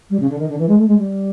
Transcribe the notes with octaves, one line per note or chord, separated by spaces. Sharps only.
G3
C#3
D3
D#3
D3
E3
G#3
A3
G#3
G3